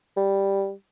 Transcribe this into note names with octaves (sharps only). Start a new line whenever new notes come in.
G3